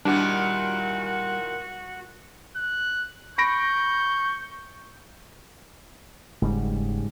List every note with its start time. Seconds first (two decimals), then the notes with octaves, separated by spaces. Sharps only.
0.05 A#2 D#3 G3 D4 E4 F#4
2.56 F#6
3.38 B5 C#6 G6 A#6 D7
6.42 F#1 G#2 C#3 G3